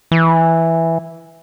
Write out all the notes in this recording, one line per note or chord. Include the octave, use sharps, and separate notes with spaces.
E3